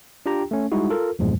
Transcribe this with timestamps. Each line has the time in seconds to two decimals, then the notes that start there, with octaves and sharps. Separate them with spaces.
0.26 D4 F4 G4 G5 A#5
0.51 A3 C#4
0.72 G3 G#3 D#4 E4 F#4
0.90 F4 A4 A#4
1.19 E2 G2 A#2 F3 G#3